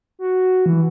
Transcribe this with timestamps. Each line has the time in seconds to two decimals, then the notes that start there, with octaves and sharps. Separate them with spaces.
0.19 F#4
0.66 E3